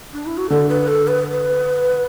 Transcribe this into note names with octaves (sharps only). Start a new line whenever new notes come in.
D4
E4
F#4
D3 A4
B4
A4
B4
B4